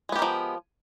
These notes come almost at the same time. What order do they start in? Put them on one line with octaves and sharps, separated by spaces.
G#3 B3 G4 A#4 F3